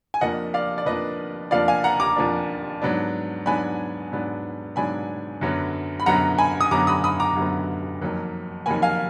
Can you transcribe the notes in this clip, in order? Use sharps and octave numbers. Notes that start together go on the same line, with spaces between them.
G#5
F2 F3 A#3 D4 D#5 F#5
D5 F5
D5
F2 F3 A#3 D4 B4 D#5
F2 F3 A#3 D4 D5 F5
F5 G#5
F#5 A#5
A#5 D6
F2 F3 A#3 D4
G#2 F#3 B3 D4
G#2 F#3 B3 D4 G#5 B5
G#2 F#3 B3 D4
G#2 F#3 B3 D4 G#5 B5
F#2 D3 F#3 B3
B5
F#2 D3 F#3 B3 F#5 A#5
G#5 B5
D#6
F#2 D3 F#3 B3 A#5 D6
B5 D#6
B5 D#6
A#5 D6
F#2 D3 F#3 B3
F2 D#3 F#3 A#3
F2 D#3 F#3 A#3 G#5 B5
F5 G#5